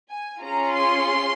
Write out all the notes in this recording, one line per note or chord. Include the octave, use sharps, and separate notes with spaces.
G#5
C#4 F4 G#4 A#5
C6